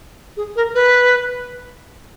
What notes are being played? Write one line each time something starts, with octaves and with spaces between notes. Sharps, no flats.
G#4
A#4
B4